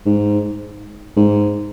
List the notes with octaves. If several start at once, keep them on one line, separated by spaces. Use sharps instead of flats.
G#2
G#2